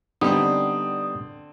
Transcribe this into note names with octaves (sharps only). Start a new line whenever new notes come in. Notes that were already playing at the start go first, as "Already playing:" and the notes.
D3 G3 B3 C4 D#4 D#6